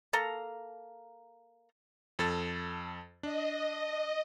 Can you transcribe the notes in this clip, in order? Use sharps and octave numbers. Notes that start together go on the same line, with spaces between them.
A#3 A4 A#5
F2 A4 A6
D4 D#5